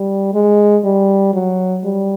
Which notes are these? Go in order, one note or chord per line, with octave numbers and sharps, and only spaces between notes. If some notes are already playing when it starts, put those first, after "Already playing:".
Already playing: G3
G#3
G3
F#3
G3